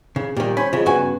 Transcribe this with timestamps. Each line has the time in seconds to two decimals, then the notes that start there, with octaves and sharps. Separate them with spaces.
0.16 C#3
0.37 A#2 D#3 G3
0.57 C#4 C5 G#5 B5
0.73 C#3 F3 G#3
0.86 G2 C#3 B3 F#4 G#5